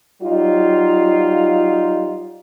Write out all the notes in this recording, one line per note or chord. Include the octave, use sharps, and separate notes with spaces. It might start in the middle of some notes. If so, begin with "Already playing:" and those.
F#3 G3 D#4 F4